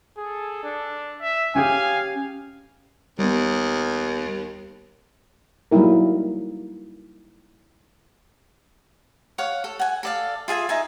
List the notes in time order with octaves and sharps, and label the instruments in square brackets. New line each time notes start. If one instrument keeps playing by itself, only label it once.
[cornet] G#4 [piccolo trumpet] A4
[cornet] D4
[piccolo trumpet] E5
[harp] C#4 G4 G#4 [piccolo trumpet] F5 [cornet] G#5
[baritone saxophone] D#2 [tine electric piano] G3 B3
[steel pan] F#3 G3 A#3 D#4 E4 A#4
[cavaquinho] C#5 F5 F#5
A4
F#5 G#5
A4 D5 F5
F4 G#4 E5 G#5
D#4 E5 G#5